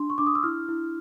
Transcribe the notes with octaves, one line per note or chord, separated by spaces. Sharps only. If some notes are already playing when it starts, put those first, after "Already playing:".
Already playing: D4 C6
C#6
D4 D6
D#6
E6
E4 F6
E4